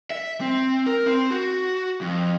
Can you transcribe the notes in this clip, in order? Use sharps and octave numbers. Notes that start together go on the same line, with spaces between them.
E5
C4
A#4
C4
F#4
F2